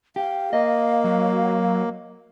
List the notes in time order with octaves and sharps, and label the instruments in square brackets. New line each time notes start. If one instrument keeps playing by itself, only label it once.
[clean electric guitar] G4 [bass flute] F5
[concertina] A#3 [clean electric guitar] D#5
[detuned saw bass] F#3